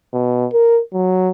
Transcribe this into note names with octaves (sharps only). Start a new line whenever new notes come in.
B2
A#4
F#3